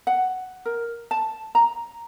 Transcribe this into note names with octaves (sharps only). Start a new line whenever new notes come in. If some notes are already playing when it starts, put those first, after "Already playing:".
F#5
A#4
A5
A#5